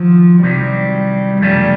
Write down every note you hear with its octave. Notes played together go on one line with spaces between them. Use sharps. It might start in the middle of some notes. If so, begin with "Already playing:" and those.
Already playing: D#3 F3 F#3
C2 C3 D#3 F#3 G3
F#2 C#3 F3 G3 A3 C#4